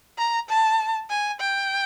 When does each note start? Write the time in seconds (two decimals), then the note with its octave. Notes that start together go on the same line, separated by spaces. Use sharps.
0.18 A#5
0.49 A5
1.10 G#5
1.40 G5